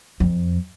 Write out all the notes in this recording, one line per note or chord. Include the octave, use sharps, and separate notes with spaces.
F2